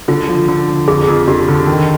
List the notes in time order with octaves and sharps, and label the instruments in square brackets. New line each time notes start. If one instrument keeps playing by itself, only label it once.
[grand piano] D3 [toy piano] F4
[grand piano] F3
D3
F3
[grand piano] F2 [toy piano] G#4
[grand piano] F2
[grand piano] D3 [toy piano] G4
[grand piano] D3
D#3